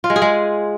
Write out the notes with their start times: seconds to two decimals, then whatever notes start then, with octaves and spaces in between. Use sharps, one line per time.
0.04 F4
0.10 G#3
0.16 G#4
0.22 G#3